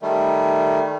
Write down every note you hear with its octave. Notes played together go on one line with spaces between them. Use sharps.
D#3 G3 A3